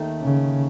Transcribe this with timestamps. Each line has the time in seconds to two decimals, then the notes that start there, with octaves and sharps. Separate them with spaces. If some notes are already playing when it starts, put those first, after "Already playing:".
Already playing: D#2 D#3 A3
0.21 C#3